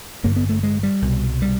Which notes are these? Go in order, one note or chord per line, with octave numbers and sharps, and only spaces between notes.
A1 G2 D3 A#3
B3
A3
G#3
G3
C2 B2
G3